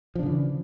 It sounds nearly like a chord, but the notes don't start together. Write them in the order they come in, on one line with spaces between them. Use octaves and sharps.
F3 D4 C#3 E3